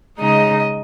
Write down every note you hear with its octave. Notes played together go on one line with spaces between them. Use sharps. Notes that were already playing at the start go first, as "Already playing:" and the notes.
C#3 G#3 D#4 D#5